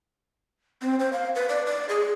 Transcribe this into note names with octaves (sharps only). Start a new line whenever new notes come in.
C4
C5
F5
B4
D5
D5
G#4